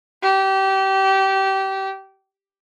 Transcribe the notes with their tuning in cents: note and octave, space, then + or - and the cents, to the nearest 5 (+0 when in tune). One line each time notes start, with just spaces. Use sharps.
G4 -25